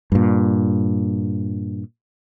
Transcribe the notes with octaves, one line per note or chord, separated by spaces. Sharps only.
G2 A#2